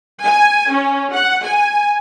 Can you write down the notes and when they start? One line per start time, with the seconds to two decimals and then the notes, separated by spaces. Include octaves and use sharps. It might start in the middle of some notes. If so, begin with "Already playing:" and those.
0.23 G#5
0.70 C#4
1.12 F#5
1.43 G#5